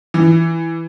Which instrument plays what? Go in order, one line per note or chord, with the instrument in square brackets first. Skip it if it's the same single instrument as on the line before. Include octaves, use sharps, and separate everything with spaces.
[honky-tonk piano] E3